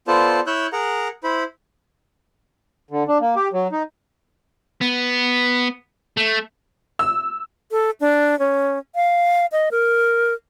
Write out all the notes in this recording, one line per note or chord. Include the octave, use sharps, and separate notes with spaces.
B3 F4 A4 C5 D5 A5
E4 C#5 E6 F#6 G6
G#4 A#4 F#5 A#5
E4 C5 B5
D3
D4
A#3
G4
F#3
D#4
B3
A3
E6
A4
D4
C#4
F5
D#5
A#4